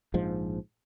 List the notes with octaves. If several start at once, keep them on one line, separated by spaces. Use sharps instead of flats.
A#1 G#2 F3